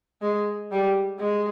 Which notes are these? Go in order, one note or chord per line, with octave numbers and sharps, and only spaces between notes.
G#3
G3
G#3